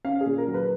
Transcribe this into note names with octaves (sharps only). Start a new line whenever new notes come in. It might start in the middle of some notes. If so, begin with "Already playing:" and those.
C#4 F5
G#4
A#2
A#4
F#3
B4